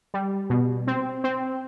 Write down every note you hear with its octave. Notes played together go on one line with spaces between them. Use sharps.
G3
B2
C4
C4